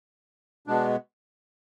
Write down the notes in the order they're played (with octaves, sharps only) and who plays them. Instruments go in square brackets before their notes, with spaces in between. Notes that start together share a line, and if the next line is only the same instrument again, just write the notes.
[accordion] B2 G#3 B3 D4